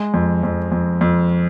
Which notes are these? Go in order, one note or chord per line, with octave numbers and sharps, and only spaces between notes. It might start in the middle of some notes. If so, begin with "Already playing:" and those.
Already playing: G#3
F2
F2
F2
F2